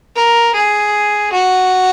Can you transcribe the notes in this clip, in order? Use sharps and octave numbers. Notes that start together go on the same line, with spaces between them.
A#4
G#4
F#4